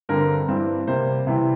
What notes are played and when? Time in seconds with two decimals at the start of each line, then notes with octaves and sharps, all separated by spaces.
0.09 G2 D3 G3 C4 A#4
0.48 G2 E3 G3 C4
0.87 C3 G3 A#3 C5
1.27 C3 E3 G3 C4